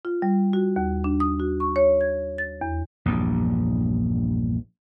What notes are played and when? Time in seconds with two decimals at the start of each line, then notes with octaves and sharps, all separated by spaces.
0.05 F4
0.22 G3
0.53 F#4
0.76 D#2
1.04 D4
1.20 D#6
1.40 F#4
1.60 C#6
1.76 C#5
2.01 G#6
2.38 A6
2.61 E2
3.06 A#1 E2 G2